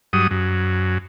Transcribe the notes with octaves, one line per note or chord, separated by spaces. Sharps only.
G2 F#3 D#6
F#2